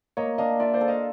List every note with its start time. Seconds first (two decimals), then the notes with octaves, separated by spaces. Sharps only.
0.17 A#3 C#5 D#5
0.38 D4 D#5 F5
0.60 F4 D5 E5
0.74 C5 D5
0.81 A4
0.88 D#5 F5